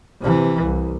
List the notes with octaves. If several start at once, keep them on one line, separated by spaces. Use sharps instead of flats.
C3 E3
C2